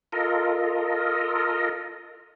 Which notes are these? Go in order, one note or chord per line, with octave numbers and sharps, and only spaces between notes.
F4 A4 A#4 D#5